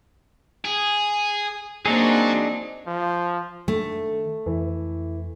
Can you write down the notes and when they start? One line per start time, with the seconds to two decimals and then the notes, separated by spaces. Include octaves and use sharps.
0.64 G#4
1.86 F#3 A#3 C4 D4 D#4 G#4
2.87 F3
3.68 D#3 A3 D4
4.46 F2 E3